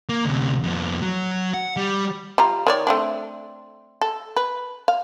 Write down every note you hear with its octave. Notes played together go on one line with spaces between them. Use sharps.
A#3
D2 C3
F2 B3
F#3
F#5
G3
G3 F4 A#5
D#3 C#5 D5
A3 C4 D4
A4
B4
F5